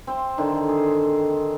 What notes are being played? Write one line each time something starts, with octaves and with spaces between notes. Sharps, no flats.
C4 C6
D3 D#3 C4
G#4